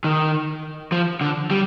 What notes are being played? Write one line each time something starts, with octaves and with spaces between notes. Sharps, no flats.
D#3
F3
D3
G3